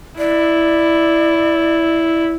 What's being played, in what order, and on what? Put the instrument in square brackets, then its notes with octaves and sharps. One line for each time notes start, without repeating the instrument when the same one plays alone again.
[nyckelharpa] E4 [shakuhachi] D5